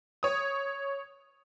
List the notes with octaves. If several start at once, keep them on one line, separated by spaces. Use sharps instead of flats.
C#5 D#6